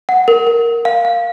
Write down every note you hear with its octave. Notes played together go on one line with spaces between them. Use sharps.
F#5
A#4
A#4
A#4
F5
F5